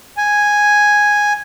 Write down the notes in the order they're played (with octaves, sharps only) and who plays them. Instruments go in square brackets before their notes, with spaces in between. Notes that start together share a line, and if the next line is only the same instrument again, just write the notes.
[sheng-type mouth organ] G#5